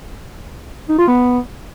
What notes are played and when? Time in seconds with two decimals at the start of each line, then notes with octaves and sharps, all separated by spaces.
0.89 D#4
0.98 F4
1.08 B3